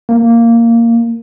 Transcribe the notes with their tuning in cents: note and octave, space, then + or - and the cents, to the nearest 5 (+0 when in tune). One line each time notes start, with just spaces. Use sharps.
A#3 -10